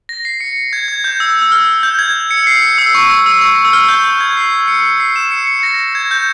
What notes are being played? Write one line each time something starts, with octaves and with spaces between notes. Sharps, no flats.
A#6
C7
C#7
G#6
G#6
G6
E6
E6
F6
G6
G#6
C#7
C7
C#7
E6
C#6
E6
E6
C#6
E6
F6
G6
G6
G#6
C7
C#7
C7
E7
C#7
C#7
A#6
G#6
G6